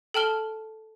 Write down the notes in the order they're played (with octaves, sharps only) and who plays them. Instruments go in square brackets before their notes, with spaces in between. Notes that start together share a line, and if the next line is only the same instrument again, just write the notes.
[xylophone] A4 G5 A5 F6 G7